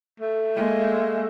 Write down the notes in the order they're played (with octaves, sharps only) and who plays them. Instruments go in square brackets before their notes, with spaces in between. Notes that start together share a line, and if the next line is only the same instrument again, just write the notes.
[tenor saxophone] A3
[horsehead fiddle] G#3 A#3